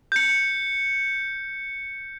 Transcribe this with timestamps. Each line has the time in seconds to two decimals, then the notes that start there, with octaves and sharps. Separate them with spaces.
0.12 G6 C#7